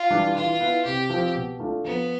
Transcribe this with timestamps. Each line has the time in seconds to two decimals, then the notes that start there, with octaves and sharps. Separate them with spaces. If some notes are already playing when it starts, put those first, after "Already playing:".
Already playing: F4
0.11 E3 G3 D4
0.36 E3 F4
0.60 B3 E4
0.85 C3 G4
1.10 F3 C4 F4
1.35 B2
1.60 A3 D4 F4
1.85 F3 B3